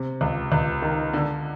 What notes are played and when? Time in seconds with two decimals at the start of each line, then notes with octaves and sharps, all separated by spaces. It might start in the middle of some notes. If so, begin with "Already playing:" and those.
Already playing: C3
0.21 C#2
0.52 C#2
0.82 D#3
1.13 D3